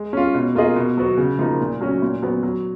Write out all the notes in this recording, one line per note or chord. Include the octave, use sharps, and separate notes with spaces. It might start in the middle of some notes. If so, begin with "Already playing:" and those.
Already playing: G#3
C#4 F4
B2
A#3 F4 G#4 D#5
B2
F#3 B3 F#4
C#3
F3 A#3 D#4
A#2
F#3 C#4 F#4
A#2
F#3 B3
F#3